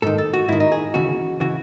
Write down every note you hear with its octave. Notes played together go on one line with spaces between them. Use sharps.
G#2 D#3 A4
A4
F#4
G#2 D#3 E4
D#4
G#4
D#2 C#3 E3 F#4
C#3 E3 F#4